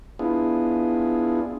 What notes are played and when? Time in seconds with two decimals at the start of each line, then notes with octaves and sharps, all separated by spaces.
0.19 B3 D4 E4 F4 G#4